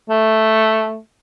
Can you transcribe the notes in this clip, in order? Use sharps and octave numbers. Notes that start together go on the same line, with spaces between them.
A3